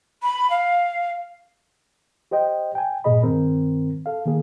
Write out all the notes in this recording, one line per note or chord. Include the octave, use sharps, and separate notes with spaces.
B5
F5
G4 C5 D#5 G5
G5 G#5
G2 A#2 G#4 D#5 B5
G2 D#3 C4 A#4
A4 F5
D#3 A#3 G#4